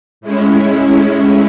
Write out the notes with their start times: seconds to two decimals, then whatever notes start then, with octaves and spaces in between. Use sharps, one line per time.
0.21 A2 G#3 C#4 E4